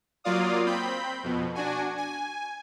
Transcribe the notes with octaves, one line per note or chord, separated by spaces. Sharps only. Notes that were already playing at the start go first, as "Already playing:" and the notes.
F#3 A#3 F4 D5 F5 D#6
C4 B5 G6
F2 B2
D4 F#4 G#5
G#5